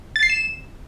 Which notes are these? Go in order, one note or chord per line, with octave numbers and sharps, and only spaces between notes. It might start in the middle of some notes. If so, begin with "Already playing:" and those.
A6
C7
E7